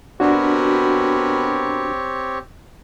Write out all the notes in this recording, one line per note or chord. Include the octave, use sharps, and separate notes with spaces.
B2 C4 D4 F#4 G4 A#4 C#5 B5